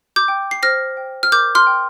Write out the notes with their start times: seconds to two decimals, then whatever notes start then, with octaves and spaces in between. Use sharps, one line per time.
0.16 D6 G6
0.28 G5
0.51 C7
0.63 C5 F6 A#6
0.97 G5
1.23 F6
1.32 A#4 D6 G6
1.55 C6 F6
1.67 G5